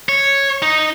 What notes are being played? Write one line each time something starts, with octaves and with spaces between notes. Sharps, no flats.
C#5
D#4